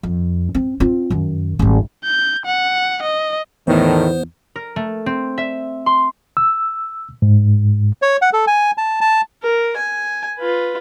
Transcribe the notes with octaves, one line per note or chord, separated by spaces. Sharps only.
F2
C4
C4 F4
F#2 D#3
G#1 G3
G6
F#5
D#5
E2 A2 D#3 B3 C5
A#4
A3
C4
E5
C6
E6
G#2
C#5
F#5
A4
G#5
A5
A5
A#4
G#5
F4 B4